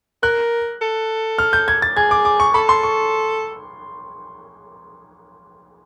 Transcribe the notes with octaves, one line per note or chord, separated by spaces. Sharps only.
A#4 F#6
A4
F6
G6
G#6
A6
G#4 G#6
D6
D6
C#6
A4 B5
C6
C#6